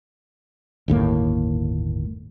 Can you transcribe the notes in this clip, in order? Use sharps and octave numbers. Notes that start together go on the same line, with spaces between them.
G1 D#2 A2 A#3